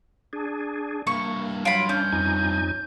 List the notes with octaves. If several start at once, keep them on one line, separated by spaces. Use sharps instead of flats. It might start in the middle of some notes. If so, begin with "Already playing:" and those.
D4 G#4
G2 A#3 E4 C#6
F#3 F4 B5 D7
C#4 D4 G6
F2 D#4 G#5